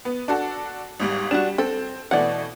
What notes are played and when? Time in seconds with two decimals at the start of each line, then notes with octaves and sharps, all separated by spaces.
0.05 B3
0.28 D4 F#4 A4
1.00 G#1 G#2 G3
1.31 G3 D4 F#4 E7
1.58 C4 A4
2.11 B2 E3 A3 D5 F#5